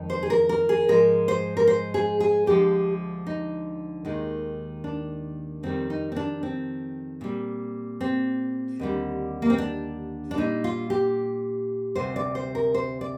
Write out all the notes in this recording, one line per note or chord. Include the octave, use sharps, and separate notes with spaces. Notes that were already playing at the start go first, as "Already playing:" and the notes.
Already playing: F2 D#3 G#3
C5
G#4
A#4
A#4
G#4
G#2 F3 G#3 A#4
C5
A#4
C5
G#4
G#4
D2 D3 F3 G#3 G4
D#4
D#2 D#3 G#3
D4
F2 D#3 G3 C4
D#4
C4
D4
C4
A#2 G3
C4
D#2 D3 G3
A#3
C4
D4
D4
A#2 G3 D#4
F4
G4
D2 C3 G3 C5
D5
C5
A#4
C5
D5